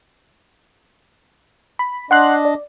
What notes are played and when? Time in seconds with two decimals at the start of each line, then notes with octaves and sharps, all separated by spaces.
1.79 B5
2.11 D4 D#5 F#5 C6 F#6
2.45 D5